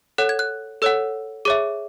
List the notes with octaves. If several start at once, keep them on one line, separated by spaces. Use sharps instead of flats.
A4 C#5 F#5 F#6
G#6
F#6
A4 C#5 F#5 E6
G#4 C#5 E5 D6